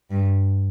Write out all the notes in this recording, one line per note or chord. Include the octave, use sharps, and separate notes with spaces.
G2